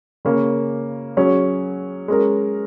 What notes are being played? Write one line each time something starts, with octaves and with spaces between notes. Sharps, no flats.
C#3 A#3 C#4
F#3 C#4 G#4 C#5
G#3 C#4 A#4